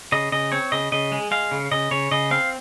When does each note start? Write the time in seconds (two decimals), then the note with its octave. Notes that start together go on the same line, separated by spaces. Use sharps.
0.12 C#3 D#5
0.32 C#3 D#5
0.52 C4 C#5
0.72 C#3 D#5
0.92 C#3 D#5
1.12 G#3
1.31 G#3 F5
1.51 C#3
1.71 C#3 D#5
1.91 C#3 C#5
2.11 C#3 D#5
2.31 C4 F5